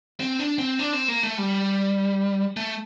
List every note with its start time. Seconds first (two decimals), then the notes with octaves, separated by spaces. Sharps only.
0.20 C4
0.39 D4
0.58 C4
0.79 D4
0.93 C4
1.08 A#3
1.23 A3
1.38 G3
2.57 A3